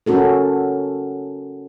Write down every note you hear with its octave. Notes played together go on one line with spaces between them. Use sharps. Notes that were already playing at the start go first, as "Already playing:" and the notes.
C#4 F#4 A4 A#4